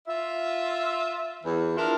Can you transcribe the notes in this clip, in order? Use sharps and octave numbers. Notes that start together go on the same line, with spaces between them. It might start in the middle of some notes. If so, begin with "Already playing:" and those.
F4 E5
E2 E3
D4 E4 F4 A#4